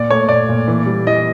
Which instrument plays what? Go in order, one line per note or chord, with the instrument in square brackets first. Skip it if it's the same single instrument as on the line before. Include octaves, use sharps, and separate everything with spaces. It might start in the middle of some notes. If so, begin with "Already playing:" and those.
Already playing: [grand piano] A#2 D5
A3 C#5
A#2 D5
A#2
E3
G3
E3 D#5